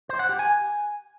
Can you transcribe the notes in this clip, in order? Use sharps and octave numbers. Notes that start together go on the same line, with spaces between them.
C5
F#5
G4
G#5